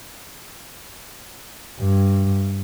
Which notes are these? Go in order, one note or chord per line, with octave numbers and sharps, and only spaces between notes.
G2